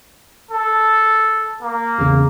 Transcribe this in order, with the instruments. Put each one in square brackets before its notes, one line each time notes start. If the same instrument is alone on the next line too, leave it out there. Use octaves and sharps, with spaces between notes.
[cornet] A4
A#3
[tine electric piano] A1 E2 C#3